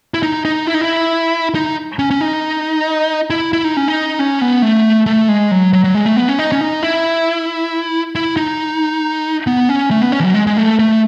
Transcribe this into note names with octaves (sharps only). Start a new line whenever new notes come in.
E4
D#4
D#4
E4
D#4
E4
D#4
C#4
C#4
D#4
E4
E4
D#4
C#4
D#4
C#4
B3
A3
A3
G#3
F#3
F#3
F#3
G#3
A3
B3
C#4
D#4
C#4
D#4
E4
E4
D#4
B3
C#4
A3
B3
C#4
E3
F#3
G#3
G#3
A3
A3